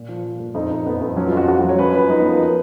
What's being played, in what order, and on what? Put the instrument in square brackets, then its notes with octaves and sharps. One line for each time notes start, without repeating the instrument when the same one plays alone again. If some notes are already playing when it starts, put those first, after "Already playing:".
Already playing: [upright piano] A#2
F3
F3
A#2
F2 D#4
F2
F2 B3
F2
F#3 C#4
F4
F2 F#4
F2 F#4
F#4
F#3
C#5
F#2 B4
F3 B4
F#2 D#4
B3
F3
A#3